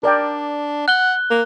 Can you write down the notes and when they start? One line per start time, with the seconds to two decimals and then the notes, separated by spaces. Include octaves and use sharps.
0.03 D4 A#4 D5 G5
0.88 F#5 F#6 G7
1.30 A#3